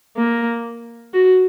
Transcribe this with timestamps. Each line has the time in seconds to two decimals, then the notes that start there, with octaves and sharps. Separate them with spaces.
0.16 A#3
1.13 F#4